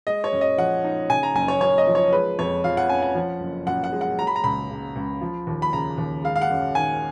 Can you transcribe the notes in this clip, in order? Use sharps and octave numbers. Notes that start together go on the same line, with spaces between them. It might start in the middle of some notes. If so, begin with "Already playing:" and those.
G#3 D#5
C#5
F#2
D#5
F3 F#5
D#4
C#3 G#5
A#5
F#1 G#5
C#5
F#2 C#5
D#5
F3
C#5
G#3 B4
F2 C#5
F3 F5
F#5
C#4 G#5
F#5
F3
F#1
F#2 F#5
F#5
G#3
F#5
F#3 A#5
B5
A#5
C#2 B5
C#3
C#2
F3
D#2
B5
C#3 A#5
D#2
G#3 F5
F5
F#5
F#2
D#3 G#5